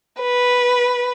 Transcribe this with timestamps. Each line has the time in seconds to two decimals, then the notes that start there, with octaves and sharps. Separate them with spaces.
0.20 B4